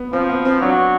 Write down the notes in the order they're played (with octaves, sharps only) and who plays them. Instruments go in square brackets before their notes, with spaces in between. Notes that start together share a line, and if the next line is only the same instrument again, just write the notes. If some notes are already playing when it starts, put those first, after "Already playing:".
Already playing: [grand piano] B3
[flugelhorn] F3 [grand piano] C4
[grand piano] B3
C4
[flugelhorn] F#3 [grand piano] D4